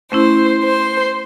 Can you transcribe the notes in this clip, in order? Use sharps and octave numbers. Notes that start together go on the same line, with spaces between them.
A3 C#4 E4 C5
C5